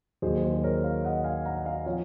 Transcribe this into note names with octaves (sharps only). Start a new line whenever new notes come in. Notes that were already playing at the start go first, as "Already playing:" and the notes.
D#2 D#3 F#3 G#4 C5
G#4 C5
A#4 C#5
C#5 F5
D#5 F#5
F5 G#5
F#5 A#5
F5 G#5
F3 C4 C#5 F5